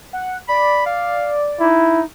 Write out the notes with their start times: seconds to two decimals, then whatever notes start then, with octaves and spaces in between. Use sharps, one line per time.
0.13 F#5
0.49 D5 B5
0.86 F5
1.60 D#4 E4